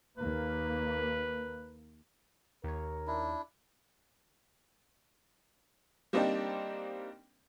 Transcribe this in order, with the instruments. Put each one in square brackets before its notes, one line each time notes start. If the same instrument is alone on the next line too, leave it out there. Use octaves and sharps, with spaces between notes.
[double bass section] D#2 A#3 [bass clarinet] B4
[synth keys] D#2 C#5 [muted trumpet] A#4
[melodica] D4 E4
[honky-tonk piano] G3 A#3 C4 D4 D#4 G4